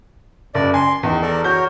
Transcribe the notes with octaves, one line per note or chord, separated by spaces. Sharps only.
F#1 D5
G#5 C6
E2 D#3
A4 A#4 D5
F#4 A#4 C#5 G6